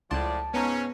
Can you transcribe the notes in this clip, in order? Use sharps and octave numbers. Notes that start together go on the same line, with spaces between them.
C#2 A2 F3 D5 A5 C6
G#2 B3 C#4 A#5